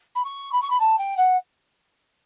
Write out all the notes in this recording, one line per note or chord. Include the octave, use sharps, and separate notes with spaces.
B5
C#6
B5
C#6
B5
A5
G5
F#5